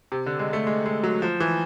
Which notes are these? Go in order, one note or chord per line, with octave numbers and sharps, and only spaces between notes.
C3
D3
G#3
A3
G#3
G#3
F#3
F3
E3